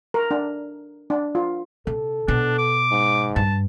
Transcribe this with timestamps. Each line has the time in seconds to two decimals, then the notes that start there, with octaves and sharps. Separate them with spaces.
0.14 A#4
0.31 D4
1.10 D4
1.35 F4
1.87 C3 A4
2.28 B2 D4
2.58 D6
2.91 G#2
3.36 G2 A5